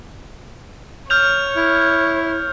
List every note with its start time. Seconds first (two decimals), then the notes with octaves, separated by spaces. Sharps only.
1.10 C#5 F6 G6 F7
1.57 E4